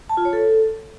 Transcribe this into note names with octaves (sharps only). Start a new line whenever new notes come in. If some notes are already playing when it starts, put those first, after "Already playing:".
A5
F4
C#5
A4